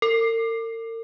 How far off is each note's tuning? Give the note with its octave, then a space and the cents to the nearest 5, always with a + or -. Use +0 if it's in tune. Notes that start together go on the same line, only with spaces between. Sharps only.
A#4 -45